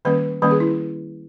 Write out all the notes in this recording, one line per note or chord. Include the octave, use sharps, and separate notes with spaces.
D#3 G3 A#3 C#4 B4
D#3 G3 A#3 C#4 B4
G#4
E4